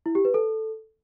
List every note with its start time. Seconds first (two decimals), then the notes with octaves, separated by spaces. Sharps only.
0.06 E4
0.15 G4
0.25 B4
0.34 A4